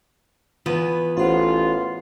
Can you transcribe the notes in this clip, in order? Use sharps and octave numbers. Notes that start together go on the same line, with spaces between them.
E2 B3 F4 B4
A1 F4 F#4 C5 F#5